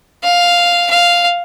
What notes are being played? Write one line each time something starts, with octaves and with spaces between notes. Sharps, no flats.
F5
F5